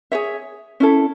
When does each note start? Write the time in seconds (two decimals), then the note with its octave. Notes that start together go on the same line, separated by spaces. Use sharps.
0.12 G#4 C#5 E5
0.80 C#4 E4 A4